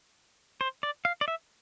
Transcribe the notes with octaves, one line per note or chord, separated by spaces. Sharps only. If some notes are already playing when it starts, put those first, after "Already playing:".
C5
D5
F5
D5
E5